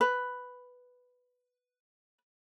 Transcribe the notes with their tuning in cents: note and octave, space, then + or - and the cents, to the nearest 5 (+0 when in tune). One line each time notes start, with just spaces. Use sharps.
B4 +5